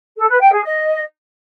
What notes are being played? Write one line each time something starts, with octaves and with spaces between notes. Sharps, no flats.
A4
B4
G5
G#4
D#5